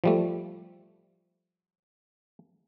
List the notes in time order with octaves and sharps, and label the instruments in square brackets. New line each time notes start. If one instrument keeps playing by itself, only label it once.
[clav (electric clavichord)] F3 G3 A3